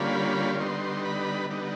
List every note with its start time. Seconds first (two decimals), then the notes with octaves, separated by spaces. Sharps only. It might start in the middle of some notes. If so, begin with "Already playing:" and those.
Already playing: D3 G3 A#3 C#4 F4 B5
0.60 D3 G3 B3 D#4 C6
1.05 B5
1.50 D3 G3 B3 D#4